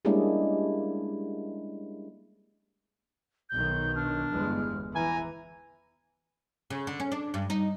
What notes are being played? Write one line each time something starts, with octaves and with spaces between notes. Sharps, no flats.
G3 G#3 A#3 C#4 D4 E4
B1 D#3 G6
D4 F6
G1 E2 G#3
E3 G#5 A#5
C#3
D3
C#4
D4
G2
D#4